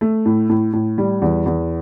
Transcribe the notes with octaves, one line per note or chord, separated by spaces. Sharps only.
A3
A2
A2
A2
G3
E2
E2